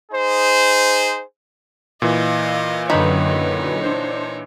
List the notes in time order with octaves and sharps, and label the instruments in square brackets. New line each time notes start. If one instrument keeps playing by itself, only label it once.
[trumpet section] D#4 G#4 C5
[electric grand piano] A#2 E3 [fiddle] D#5 F5
[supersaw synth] F#2 D3 B4 [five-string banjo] D#3 B5 [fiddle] D#4 C#5
[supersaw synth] D4 C5